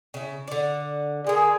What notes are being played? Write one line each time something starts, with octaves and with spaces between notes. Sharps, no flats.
C#3 E4
D3 D5
D3 A#3 G#4